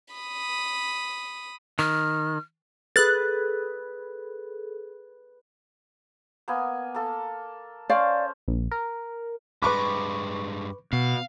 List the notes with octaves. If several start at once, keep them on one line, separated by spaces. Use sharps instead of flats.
B5 D#6
D#3 F6
G#4 A4 B4 F#6 A6
A#3 B3 G#5
A#3 A4
C#4 C5 D5 F5
A#1
A#4
G2 G#3 B4 B5 C#6 D6
B2 F5